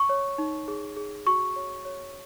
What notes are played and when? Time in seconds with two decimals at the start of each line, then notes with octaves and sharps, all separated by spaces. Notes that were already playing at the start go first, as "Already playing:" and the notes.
Already playing: C#6
0.09 C#5
0.38 D#4
0.68 G#4
0.97 G#4
1.27 F#4 C#6
1.56 C#5
1.85 C#5